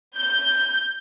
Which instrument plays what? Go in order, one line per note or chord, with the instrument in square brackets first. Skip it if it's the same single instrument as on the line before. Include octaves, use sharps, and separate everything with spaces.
[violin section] G6